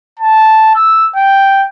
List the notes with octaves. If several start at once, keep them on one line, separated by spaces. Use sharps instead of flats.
A5
E6
G5